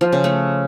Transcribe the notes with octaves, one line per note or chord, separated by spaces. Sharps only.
F3
C#3
A3